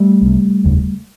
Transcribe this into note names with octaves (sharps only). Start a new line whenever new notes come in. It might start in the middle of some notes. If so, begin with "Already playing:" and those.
Already playing: G3 A3
C2 C3
F1 D#2 C#3